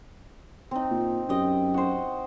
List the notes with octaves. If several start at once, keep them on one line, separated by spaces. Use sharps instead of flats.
C4 D#4
A#2
F#2 G4 D#5
F#4 C5